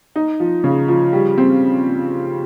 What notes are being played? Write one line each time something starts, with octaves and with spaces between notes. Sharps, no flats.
D#4
F3
C#3
F3
G3
C4